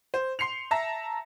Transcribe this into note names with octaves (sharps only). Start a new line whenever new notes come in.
C5
C6 C7 C#7 F7
E5 A5 A#5 A#6